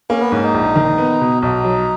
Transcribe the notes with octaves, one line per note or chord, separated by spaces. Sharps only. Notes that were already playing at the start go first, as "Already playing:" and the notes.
A#3 C#4
B3
G#2 C#4
D#4
A#1
D#3
B3
B2
B1 D#4
F#3